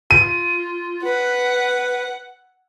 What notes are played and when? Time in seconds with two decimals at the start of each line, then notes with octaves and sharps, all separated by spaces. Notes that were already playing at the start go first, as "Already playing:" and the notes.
0.11 F4 D#7
1.04 B4 F#5